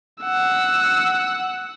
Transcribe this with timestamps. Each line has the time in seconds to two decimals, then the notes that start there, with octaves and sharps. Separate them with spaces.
0.22 F#5 E6